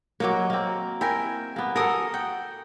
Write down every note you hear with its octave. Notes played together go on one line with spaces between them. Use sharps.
F#3 A#3 C#5 D#5 D6
A#3 C4
E4 A#4 G5 G#5
A#3 B3
F#4 A4 A#4 G#5 D#6
F#5 G5